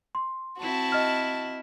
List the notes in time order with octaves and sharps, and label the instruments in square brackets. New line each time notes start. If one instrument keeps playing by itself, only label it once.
[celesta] C6
[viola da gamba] C4 E4 [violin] F#4 A5
[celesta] D#5 F6